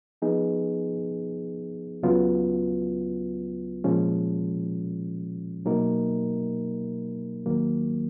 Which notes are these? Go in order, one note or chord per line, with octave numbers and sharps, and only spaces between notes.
F3 B3 D#4 G#4
C#2 C#3 F#3 B3 F4
A#2 F3 G#3 C#4
B2 F#3 A#3 D#4 A#4
D#2 D#3 F#3 A#3